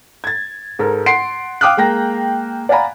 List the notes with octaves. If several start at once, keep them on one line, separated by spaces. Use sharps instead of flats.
G#6 A6
G#2 A4 A#4
F#5 C6 C7 D7
F5 G5 D6 D#6 F6 F#6
G#3 A#3 G5 A#6
D5 F5 F#5 G#5 A#5 B5